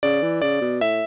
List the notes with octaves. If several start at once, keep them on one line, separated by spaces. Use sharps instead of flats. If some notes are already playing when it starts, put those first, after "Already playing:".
C#3 D5
E3
C#3 D5
B2
A2 E5